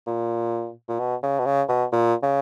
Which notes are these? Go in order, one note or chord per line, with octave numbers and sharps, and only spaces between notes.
A#2
A#2
B2
C#3
B2
C#3
B2
A#2
C#3